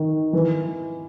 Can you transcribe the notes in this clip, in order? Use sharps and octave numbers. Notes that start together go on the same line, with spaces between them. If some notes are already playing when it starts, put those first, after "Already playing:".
Already playing: D#3
E3